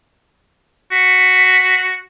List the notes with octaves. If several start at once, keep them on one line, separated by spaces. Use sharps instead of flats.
F#4 B6